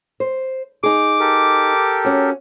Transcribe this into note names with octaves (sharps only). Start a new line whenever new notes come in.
C5
D#4 G#4 D6
G4 A4 A#4
C#4 F#4